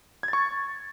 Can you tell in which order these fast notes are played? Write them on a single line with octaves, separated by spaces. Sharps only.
G#6 A6 C#6